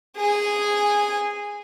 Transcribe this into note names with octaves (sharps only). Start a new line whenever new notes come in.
G#4 G#5